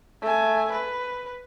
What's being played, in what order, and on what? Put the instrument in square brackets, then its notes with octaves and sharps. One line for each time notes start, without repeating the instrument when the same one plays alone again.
[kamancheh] A3 G#5
B4